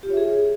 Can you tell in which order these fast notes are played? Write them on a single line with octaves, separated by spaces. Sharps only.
G4 F4 C#5 E5 G#4